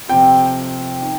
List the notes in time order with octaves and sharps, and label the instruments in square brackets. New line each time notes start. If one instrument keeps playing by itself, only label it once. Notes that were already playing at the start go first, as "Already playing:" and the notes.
[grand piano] F2 C3 F3 C4 F4 [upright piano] G5
[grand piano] D#3